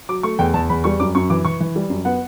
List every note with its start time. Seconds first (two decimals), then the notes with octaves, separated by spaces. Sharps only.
0.09 F#3 D6
0.23 A3 C#6
0.39 E2 G5
0.54 E2 A5
0.69 E2 B5
0.84 G3 C#6
1.00 F#2 D6
1.15 F#2 C#6
1.30 E3 D6
1.45 E3 C#6
1.60 E3
1.76 G3
1.90 F#2
2.05 B3 F#5